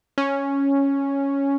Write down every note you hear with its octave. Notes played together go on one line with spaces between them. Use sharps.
C#4